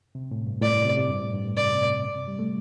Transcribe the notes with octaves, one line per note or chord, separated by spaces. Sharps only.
C3
A2
G2
A2 D5
C3
C3
G2
A2
G2
A2
C3 D5
C3
A2
C3
G3
A3